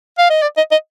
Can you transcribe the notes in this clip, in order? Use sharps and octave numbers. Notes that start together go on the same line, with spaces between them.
F5
D#5
D5
D#5
D#5